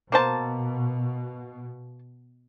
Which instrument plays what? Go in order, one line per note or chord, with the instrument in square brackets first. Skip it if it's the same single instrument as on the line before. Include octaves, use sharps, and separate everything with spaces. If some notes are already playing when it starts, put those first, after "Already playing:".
[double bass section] B2 [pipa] A#3 C5 A5